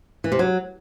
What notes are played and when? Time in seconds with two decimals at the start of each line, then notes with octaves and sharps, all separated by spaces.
0.24 E3
0.32 C3
0.39 F#3